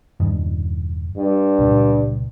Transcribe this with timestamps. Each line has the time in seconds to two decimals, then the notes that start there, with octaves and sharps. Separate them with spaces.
0.20 E1 G2 D#3
1.17 G2
1.59 C#2 A#2